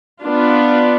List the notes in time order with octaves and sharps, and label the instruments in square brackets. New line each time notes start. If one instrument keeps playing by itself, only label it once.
[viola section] B3 D4 F4